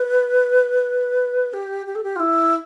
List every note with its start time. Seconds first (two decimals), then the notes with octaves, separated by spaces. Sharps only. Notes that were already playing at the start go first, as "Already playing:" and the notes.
Already playing: B4
1.54 G4
1.87 G4
1.95 A4
2.03 G4
2.16 F4
2.20 E4